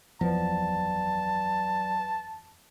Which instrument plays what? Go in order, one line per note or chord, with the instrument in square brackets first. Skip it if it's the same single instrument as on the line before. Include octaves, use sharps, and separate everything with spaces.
[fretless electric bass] F#1 E2 F3 [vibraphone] F#3 B4 D5 [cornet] A5